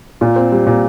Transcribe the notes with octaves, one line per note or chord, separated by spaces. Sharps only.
A#2 F4
C4
G3
A#2